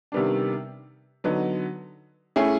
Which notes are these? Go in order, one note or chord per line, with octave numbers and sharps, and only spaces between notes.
C3 D#3 G3 B3 D4
D3 F#3 B3 D#4
A3 C#4 E4 G#4